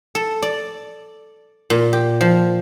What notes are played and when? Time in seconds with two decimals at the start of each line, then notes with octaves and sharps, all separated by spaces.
0.15 A4
0.42 D5
1.70 A#2
1.93 G4
2.21 F3